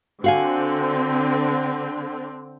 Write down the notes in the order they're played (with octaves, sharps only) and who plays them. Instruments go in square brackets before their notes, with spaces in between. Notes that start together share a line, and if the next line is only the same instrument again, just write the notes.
[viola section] D3 C4 [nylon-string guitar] F#4 F5 G#5